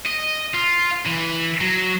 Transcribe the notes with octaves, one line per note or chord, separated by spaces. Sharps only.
D#5
F4
E3
F#3